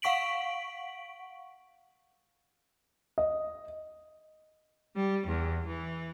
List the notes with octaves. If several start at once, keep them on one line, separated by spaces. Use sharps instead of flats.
F5 F#5 C#6 B6 D7 F#7
D#5
G3
E2
E3